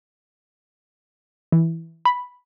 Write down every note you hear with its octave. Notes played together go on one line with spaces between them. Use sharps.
E3
B5